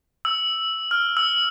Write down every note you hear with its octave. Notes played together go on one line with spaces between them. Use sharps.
E6
F6
E6